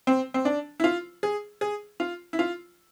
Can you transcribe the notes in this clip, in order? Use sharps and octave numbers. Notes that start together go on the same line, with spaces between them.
C4
C4
D4
E4
F4
G#4
G#4
F4
E4
F4